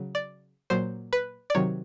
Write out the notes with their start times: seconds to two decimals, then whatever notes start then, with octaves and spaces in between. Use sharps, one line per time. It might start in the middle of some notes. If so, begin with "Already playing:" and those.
Already playing: C#3 F#3
0.15 D5
0.70 A#2 F#3 C5
1.13 B4
1.50 D5
1.55 C3 D#3 F#3 C#5